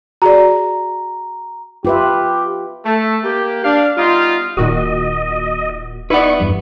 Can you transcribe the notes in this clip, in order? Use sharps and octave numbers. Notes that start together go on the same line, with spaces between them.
F#4 G#4 D5 A#5
F4 G4 B4 E5
A3
A#3 G4
D4 F5
G3 B3 D#4 F4
D#1 A#2 D#3 F#4 D#5
D#4 E4 B4 D5 F#5 C#6
E2 G2